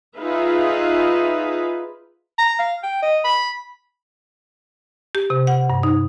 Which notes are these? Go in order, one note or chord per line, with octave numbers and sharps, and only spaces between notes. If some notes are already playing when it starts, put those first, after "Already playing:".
D#4 F4 G#4 B4 E5 F5
A#5
F5
G5
D#5
B5
G4
C3
F#5
G2
D#4